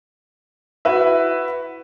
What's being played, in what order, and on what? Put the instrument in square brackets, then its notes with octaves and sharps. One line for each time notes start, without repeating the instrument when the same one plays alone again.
[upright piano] E4 F#4 B4 E5